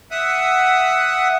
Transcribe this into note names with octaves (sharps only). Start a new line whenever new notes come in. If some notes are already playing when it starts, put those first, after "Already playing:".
E5 F#5 D#6